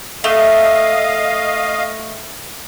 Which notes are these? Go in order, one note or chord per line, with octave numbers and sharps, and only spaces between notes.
A3 D#5 F5